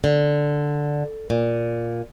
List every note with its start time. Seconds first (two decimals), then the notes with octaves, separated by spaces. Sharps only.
0.04 D3
1.30 A#2